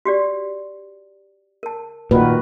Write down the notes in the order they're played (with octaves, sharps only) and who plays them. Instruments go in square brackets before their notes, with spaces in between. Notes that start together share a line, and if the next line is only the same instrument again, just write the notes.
[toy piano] F#4 G4 D5
A#4 A5
[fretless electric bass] A#2 D#3 [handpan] A#3 F#4 B4